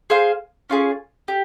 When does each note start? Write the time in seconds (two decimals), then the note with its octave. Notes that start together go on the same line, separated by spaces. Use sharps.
0.10 G#4 C5 F5
0.70 C#4 F4 G#4
1.28 G4